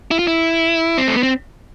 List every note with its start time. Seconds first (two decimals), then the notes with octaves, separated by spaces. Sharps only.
0.11 E4
0.19 F4
0.27 E4
0.98 C4
1.07 A3
1.16 B3
1.23 C4